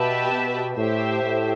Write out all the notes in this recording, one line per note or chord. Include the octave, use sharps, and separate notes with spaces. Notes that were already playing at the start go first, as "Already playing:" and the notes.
Already playing: B2 G4 B4 E5 A5
B2
A2 G4 C5 E5
A2